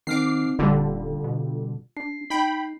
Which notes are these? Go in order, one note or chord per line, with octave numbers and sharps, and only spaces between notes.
D#3 C4 D#4 D6 F6 C7
D#1 D3 G3 F4
B2
D4 C7
D#4 G5 B5